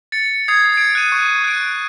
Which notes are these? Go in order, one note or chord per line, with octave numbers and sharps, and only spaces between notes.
A6 C#7
D#6 G#6 C7
G#6 D7
F#6 D#7
C#6
F#6 D7